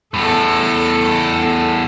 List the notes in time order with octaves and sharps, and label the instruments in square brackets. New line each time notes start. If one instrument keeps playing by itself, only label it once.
[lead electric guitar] E2 A2 [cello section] A4